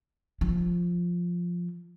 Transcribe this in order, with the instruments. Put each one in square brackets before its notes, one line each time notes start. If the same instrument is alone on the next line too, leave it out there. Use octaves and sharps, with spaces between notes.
[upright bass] F3